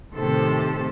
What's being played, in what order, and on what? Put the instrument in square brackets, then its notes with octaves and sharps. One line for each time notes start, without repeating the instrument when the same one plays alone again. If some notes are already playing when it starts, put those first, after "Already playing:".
[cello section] A2 C3 D#3 G4 A4 C5